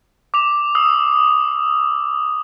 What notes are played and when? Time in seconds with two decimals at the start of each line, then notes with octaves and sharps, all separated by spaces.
0.34 D6 F7
0.75 D#6 E6